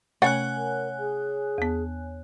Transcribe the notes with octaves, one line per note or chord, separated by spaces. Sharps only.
C3 A3 C#4 C#5 F#5 G#5 F#6
A#4
G#4
E2 B3